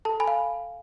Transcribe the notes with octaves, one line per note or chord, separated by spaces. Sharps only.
A4 A5
G#5 B5
F5